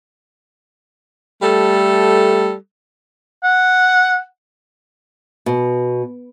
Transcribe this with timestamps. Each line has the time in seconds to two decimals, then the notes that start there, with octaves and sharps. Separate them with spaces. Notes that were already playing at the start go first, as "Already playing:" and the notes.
1.42 G3 A3 A4
3.43 F#5
5.46 B2